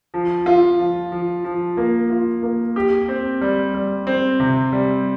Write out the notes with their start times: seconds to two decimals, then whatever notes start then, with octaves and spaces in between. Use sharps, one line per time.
0.14 F3
0.46 F4
0.79 F3
1.12 F3
1.44 F3
1.77 A#3
2.10 F4
2.43 A#3
2.76 G4
3.08 C4
3.41 G3
3.75 G3
4.07 C4
4.40 C3
4.73 G3